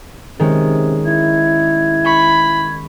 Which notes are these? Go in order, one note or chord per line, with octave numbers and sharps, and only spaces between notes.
C3 D#3 G#3 C#4
E4 G#6
B5 C#6